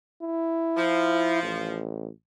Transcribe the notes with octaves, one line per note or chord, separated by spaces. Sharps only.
E4
F3
A1